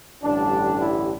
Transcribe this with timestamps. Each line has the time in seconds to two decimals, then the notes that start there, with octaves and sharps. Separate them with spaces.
0.24 A1 G2 D3 G3 D4
0.82 E4